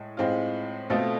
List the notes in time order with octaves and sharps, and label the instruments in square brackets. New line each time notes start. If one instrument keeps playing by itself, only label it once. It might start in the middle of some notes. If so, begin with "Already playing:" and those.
Already playing: [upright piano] A2 G#3
A2 G#3 C4 F4
B2 A3 C4 F4 A4